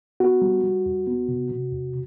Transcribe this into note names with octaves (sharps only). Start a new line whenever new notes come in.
B3 F#4
G3
G3
E2
B3
C3
C3
E2